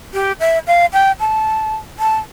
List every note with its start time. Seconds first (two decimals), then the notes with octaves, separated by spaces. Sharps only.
0.14 G4
0.40 E5
0.67 F5
0.93 G5
1.20 A5
1.99 A5